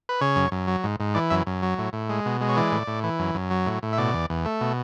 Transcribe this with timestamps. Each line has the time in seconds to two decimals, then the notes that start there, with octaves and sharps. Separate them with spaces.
0.09 B4
0.21 C#3 C#5
0.36 F#2
0.52 F#2
0.67 F#3
0.84 G#2
1.00 G#2
1.14 E3 D5
1.30 F#2 E5
1.46 F#2
1.63 F#3
1.78 A2
1.93 A2
2.09 G#3
2.26 B2
2.41 G#3
2.49 C#5
2.57 E3 D5
2.72 A2
2.87 A2
3.04 E3
3.19 F#2
3.35 F#2
3.51 F#3
3.66 A2
3.83 A2
3.93 E5
3.98 B2 D5
4.14 E2
4.30 E2
4.45 A3
4.61 B2